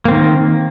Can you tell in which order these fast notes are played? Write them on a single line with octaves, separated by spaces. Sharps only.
A#3 C4 D#3